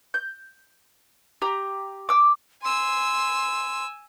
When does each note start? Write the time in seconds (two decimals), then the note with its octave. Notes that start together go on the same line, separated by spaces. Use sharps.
0.14 G6
1.42 G4 A#5
2.09 D6 E6
2.63 G#5 C6 E6